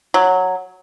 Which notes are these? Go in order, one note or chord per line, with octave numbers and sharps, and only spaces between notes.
F#3